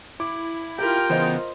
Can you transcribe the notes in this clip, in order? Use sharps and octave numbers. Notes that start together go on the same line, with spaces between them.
E4 D6
F4 G4 A#4 G5
C#3 E3 B3 C5 D#5